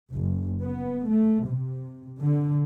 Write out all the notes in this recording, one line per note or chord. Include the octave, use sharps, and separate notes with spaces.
F#1
B3
A3
C3
D3